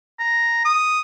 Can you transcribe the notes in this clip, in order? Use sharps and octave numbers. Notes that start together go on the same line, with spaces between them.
A#5
D#6